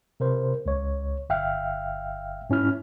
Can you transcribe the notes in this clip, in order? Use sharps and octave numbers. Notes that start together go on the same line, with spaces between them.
C3 A#4 C5
C#2 C#5
G1 E5 F5 G5 F6
G#2 C#4 E4 F6